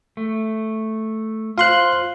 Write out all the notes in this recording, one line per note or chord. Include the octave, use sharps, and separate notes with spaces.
A3
F4 C5 F5 C6 F#6